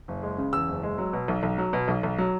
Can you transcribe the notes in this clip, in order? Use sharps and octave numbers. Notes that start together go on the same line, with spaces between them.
F#1
G#3
C#3
E2 E6
F#1
G#3
F#3
B2
B1
B1
F#3
B2
B1
B1
F#3